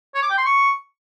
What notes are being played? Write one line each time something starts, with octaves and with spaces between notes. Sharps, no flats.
C#5
D6
G5
C6
C#6